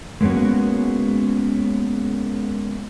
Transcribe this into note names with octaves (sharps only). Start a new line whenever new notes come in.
G#3 A#3 B3 C#4 F#4